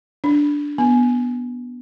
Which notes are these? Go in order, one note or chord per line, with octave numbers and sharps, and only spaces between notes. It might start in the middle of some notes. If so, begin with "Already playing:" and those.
D4
B3